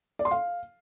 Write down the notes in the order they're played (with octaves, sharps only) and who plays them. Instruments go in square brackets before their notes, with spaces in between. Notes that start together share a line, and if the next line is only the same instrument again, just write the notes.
[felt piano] D5
C6
F5